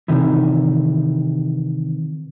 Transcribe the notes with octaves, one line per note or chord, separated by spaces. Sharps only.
C3 D#3 E3